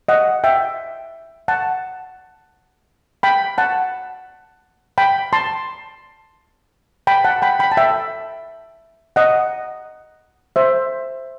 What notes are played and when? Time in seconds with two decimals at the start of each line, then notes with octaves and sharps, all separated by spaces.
0.08 D#5 F#5
0.44 E5 G5
1.48 F#5 A5
3.23 G5 B5
3.58 F#5 A5
4.98 G5 B5
5.33 A5 C6
7.07 G5 B5
7.24 F#5 A5
7.42 G5 B5
7.59 G5 B5
7.72 A5
7.77 E5 G5
9.16 D#5 F#5
10.56 C5 E5